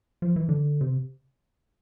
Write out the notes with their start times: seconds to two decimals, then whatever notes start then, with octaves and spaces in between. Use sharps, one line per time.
0.22 F3
0.36 E3
0.49 D3
0.81 C3